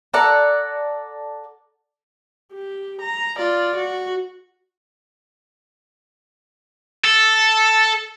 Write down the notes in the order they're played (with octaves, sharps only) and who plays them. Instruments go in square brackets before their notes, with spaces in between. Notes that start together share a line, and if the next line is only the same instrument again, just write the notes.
[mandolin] A4 D5 F#5 A#5
[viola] G4
A#5
F4 D5
F#4
[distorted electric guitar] A4